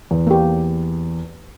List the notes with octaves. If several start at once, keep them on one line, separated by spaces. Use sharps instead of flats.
E2
A#3 G4